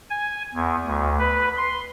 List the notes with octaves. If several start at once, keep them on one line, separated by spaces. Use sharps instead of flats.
G#5
E2
D2
B4
C6